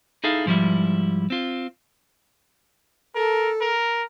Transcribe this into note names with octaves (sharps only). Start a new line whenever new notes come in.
D#4 E4 G#4 A4 F5
G#2 F3 G3 E4
C4 F4
A4 A#4
A#4